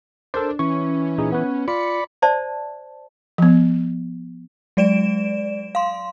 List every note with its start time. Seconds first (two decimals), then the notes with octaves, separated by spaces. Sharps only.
0.34 D4 A4 A#4 C5
0.59 E3 C#4 C#6
1.18 A#2 D#4 G#4
1.32 B3 B4
1.68 F4 D5 B5 C#7
2.22 C5 D5 E5 A5
3.38 F3 B3
4.77 F#3 G#3 D5 D7 E7
5.75 F5 C6